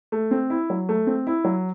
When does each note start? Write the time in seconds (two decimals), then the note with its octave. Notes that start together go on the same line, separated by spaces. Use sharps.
0.12 A3
0.31 C4
0.50 E4
0.70 F#3
0.89 A3
1.07 C4
1.27 E4
1.45 F#3